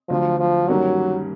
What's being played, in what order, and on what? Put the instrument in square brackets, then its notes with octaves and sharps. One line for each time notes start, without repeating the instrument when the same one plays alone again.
[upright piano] D2 D3 F#3 [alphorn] F3
[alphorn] F3
[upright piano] G2 D#3 G3 A#3 C#4 [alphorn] F#3